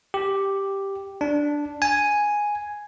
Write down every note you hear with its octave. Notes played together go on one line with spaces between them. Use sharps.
G4
D4
G#5